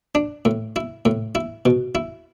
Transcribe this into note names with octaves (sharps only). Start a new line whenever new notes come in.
D4
A2
E4
A2
E4
B2
E4